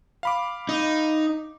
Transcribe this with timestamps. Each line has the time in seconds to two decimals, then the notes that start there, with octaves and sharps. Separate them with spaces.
0.23 F5 B5 D6
0.69 D#4